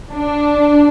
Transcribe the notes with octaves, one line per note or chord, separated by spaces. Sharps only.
D4